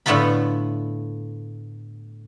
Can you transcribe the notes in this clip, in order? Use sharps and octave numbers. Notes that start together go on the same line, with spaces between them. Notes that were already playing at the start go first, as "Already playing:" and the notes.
A2 D3 A3 B3 F4 B5